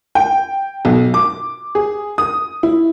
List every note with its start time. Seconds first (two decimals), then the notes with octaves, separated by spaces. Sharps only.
0.15 G5
0.85 B1
1.14 D6
1.75 G#4
2.18 D#6
2.63 E4